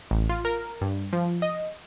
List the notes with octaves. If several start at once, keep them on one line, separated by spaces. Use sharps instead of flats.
A1
F4
A#4
G2
F3
D#5